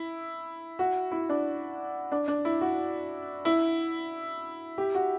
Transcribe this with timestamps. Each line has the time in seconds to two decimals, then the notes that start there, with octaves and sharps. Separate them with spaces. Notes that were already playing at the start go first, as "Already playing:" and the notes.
Already playing: E4
0.79 F#4
1.12 E4
1.29 D4
2.12 D4
2.28 D4
2.45 E4
2.61 F#4
3.45 E4
4.78 G4
4.95 F#4